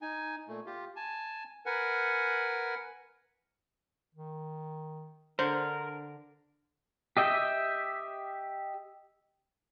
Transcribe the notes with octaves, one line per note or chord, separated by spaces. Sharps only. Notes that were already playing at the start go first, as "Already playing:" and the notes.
D#4 G#5
A#2 A3
F4 G4
G#5 A5
A#4 B4 F#5 G#5
D#3
D3 D4 A#4 C5
G4 D#5 E5 G5